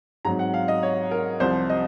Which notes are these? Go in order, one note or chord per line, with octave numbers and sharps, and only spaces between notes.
G#2 F#3 C4 A#5
F#5
F5
D#5
C#5
A#4
C2 C3 F3 C5
D#5